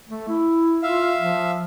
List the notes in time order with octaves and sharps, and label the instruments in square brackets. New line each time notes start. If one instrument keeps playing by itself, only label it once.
[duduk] A3
E4
[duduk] F4 [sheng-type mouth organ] E5 F5
[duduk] F3